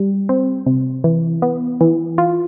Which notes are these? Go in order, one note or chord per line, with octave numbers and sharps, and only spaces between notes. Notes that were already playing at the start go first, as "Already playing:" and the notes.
Already playing: G3
C4
C3
E3
B3
E3
F4